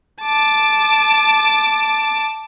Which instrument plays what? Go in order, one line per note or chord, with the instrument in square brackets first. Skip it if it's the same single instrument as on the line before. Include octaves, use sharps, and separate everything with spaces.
[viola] A5 D6